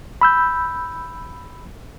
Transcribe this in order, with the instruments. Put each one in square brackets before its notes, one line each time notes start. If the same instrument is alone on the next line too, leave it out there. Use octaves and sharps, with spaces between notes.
[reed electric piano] B5 E6 G6